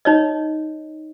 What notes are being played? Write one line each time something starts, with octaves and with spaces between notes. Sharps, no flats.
D#4 C#5 D#5